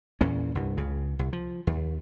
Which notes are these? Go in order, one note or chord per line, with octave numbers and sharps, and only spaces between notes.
E2 A#2 C#4
C2 G2
C#2 C#3
C2
F3
D#2